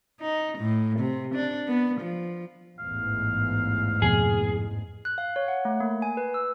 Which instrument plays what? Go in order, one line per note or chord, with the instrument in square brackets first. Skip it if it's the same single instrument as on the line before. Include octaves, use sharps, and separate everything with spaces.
[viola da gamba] D#4
A2
C3
D4
B3
F3
[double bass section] A1 E2 G#2 [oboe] F5
[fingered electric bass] F2 B2 [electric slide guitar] G#4
[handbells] F#6
F5
C#5
F#5
A3
A#3
G#5
B4
E6